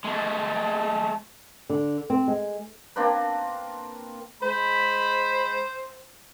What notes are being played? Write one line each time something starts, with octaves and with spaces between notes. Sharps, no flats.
G#3 A3
D3
C4
G#3
A#3 C4 D4 B4
G#3 C5 B5